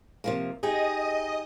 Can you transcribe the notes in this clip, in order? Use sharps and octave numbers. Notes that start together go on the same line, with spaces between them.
C3 F3 A#3
D#4 G4 G#4 D#5 D#6